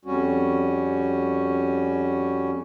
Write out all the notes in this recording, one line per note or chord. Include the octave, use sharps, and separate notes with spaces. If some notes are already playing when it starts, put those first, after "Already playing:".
F2 G3 C#4 F#4